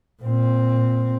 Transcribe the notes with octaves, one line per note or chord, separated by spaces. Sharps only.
A#2 C4